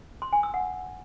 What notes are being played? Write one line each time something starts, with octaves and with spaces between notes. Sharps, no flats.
C6
G#5
E6
F#5